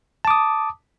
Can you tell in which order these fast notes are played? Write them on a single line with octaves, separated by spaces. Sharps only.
A5 D6 D#6